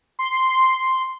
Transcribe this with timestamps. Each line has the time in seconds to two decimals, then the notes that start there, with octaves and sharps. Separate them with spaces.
0.19 C6